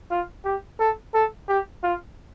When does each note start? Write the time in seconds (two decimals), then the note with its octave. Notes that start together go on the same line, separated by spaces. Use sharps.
0.11 F4
0.45 G4
0.80 A4
1.14 A4
1.48 G4
1.83 F4